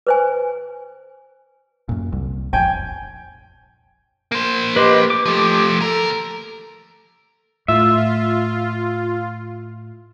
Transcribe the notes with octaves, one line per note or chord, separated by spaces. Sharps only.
B4 C5 G#5
F#2 A#2
C2
E1 A#1 F2 G5 G#5
A#3 C5
G4 B4 D#5 C6
D6
F3 A3 G4
D#2 A4 A#4
A2 F4 E5